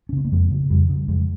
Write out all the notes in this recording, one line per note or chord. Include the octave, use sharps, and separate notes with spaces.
C#4
C#3 C4
A#3
F2 G#3
C#3
F2 G3
C#3
F2 G#3